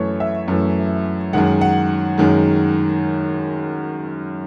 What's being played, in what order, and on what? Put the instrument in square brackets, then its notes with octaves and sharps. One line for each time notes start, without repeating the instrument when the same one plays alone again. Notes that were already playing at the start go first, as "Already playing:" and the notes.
Already playing: [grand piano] F#2 E3 A3 C#5
E5
F#2 E3 A3
F#2 D#3 G#3 F#5
F#5
F#2 D#3 G#3